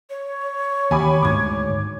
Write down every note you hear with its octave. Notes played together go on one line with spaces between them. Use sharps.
C#5
D#2 G#5 B5 D6
D2 G#2 D6 G#6